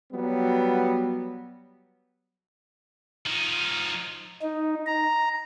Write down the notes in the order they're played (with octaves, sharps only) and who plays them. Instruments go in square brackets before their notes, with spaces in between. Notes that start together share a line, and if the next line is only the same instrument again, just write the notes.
[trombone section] F#3 G3 B3
[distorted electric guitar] F3 D#4
[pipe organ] D#4
A#5